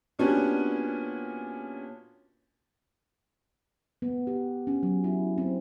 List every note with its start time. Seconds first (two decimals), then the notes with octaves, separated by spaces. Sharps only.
0.19 A#2 B3 C#4 D4 F#4 G4
4.02 B3
4.27 G4
4.67 C#4
4.83 F#3
5.04 E4
5.38 C4